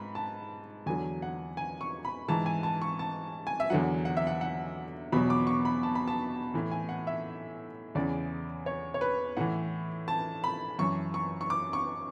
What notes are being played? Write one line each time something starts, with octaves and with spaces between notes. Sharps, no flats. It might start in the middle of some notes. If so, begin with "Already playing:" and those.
Already playing: G#2 B5
A5
E2 D3 F#3 G#5
F#5
G#5
C#6
B5
G#2 E3 A5
G#5
A5
C#6
A5
G#5
E5
E2 D3 F#3 F#5
F#5
E5
F#5
F#5
E2 B2 F#3 B5
D6
C#6
B5
A5
B5
A5
A2 E3
G#5
F#5
E5
E2 C#3 E3 D5
C#5
C#5
B4
A2 E3 F#5
A5
B5
F#2 E3 C#6
C#6
C#6
D6
C#6